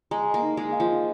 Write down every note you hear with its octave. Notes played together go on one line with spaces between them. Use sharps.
G#3 A#5
A#3
D#4
G#3
F5
F3